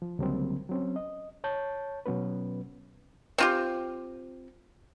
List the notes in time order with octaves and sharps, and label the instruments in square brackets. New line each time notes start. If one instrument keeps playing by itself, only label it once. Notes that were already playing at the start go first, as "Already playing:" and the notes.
[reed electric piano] F3
C#2 D3 F#3 G3 A#3 C4
F#3 C4 C#4
D#5
C#5 A5 G6
B2 F#3 B3 C#4 B4
[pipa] C4 F4 G4